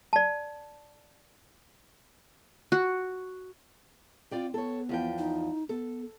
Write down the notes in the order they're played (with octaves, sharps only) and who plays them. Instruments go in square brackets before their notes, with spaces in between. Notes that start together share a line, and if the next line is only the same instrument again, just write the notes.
[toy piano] D5 A5
[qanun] F#4
[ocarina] C4 [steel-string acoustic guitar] F4 D5 G5
[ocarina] B3 [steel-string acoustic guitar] A4 C#5
[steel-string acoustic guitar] E2 F3 G5
[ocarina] D#4
[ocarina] B3 [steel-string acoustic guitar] A4